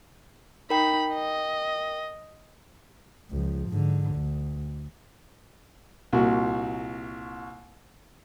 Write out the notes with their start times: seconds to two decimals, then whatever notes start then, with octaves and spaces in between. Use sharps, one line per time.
0.70 D#4 A#4 G5 B5
1.14 D#5
3.31 C#2 F3
3.69 G#2 D3
4.14 D2
6.13 C2 A#2 F#4